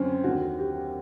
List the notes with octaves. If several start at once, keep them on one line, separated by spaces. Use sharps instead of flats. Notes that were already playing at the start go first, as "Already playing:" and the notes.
Already playing: F#2 D3 C4 C#4
D#2 D3 F#4
G4